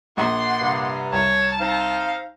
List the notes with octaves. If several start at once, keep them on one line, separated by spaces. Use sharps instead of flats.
A#1 F#5 C6
G2 C3
C2 C#5 A5
C4 D#4 F5